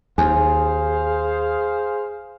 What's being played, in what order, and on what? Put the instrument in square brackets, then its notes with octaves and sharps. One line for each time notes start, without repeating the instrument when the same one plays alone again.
[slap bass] D#2 [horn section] G#4 C5 F5 [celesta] G#5